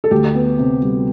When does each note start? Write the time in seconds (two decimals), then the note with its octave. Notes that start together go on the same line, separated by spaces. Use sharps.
0.04 A4
0.11 D2 G4
0.35 B3
0.59 C3
0.82 G3